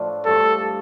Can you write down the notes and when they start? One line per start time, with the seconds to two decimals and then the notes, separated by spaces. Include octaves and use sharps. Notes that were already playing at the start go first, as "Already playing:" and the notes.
Already playing: A2 F3 A3 D4 F4
0.25 G2 F3 A3 A4